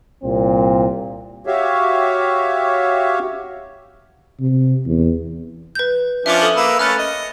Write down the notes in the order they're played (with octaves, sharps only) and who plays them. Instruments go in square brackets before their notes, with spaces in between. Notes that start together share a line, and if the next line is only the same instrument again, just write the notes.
[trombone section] C2 A#2 C4
[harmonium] F#4 G4 C#5 E5 F5
[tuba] C3
E2
[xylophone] B4 G6
[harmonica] F3 C#4 D4 [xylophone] E5 D6
[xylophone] A4 D#6
[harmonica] A#3 B4 E6
[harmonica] A3 C#4 B4 [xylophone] F6 F#6 A6
[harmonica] D#5